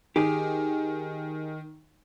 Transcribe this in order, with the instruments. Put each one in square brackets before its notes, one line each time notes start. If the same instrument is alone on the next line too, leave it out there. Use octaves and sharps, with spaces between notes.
[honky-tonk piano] D#3 [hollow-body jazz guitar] G4 G#4